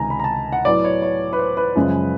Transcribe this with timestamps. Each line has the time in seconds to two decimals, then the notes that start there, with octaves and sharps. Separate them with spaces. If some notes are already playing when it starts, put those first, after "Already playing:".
Already playing: C#2 C3 D#3 G#5 A#5
0.10 B5
0.19 A#5
0.24 A5
0.52 F#5
0.65 A2 F#3 B3 D5
0.84 C#5
1.02 C#5
1.33 B4
1.39 C5
1.57 B4
1.76 F#2 C#3 F3 G#3